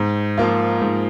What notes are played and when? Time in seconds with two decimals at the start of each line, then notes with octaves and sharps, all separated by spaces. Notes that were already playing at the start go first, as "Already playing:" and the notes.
Already playing: G#2
0.38 F3 A#3 F4
0.81 G#2